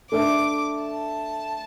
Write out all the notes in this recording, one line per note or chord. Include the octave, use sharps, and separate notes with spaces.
A3 D4 A4 E5 D6
A5